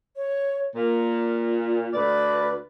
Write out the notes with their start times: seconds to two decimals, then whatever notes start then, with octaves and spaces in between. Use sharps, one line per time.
0.16 C#5
0.75 A#2 A#4
1.93 D2 B4 D5